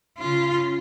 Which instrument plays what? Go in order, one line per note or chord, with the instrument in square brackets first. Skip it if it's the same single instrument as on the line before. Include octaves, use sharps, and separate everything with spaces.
[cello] C#3 F4